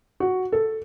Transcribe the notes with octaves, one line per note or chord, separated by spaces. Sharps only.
F#4
A4